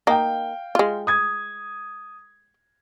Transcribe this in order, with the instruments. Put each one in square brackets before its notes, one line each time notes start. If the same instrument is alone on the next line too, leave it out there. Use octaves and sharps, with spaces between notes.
[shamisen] A#3 D#4 [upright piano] F5 G5
[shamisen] G#3 F4
[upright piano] D#6 G#6